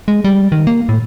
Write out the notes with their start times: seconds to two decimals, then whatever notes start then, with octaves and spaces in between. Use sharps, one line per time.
0.08 G#3
0.24 G3
0.52 D#3
0.67 A#3
0.89 A2